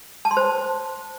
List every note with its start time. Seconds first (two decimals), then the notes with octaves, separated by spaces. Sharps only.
0.25 A5
0.31 C6
0.37 C5